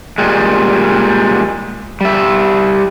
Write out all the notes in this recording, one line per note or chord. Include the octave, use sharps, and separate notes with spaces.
A#2 G3 G#3
G3 E5